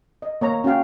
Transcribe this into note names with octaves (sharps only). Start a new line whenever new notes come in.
D#5
A#3 C#5 A#5
C#4 F#4 F5 G5